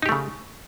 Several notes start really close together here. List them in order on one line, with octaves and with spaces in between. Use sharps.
D#4 G4 A3 C#3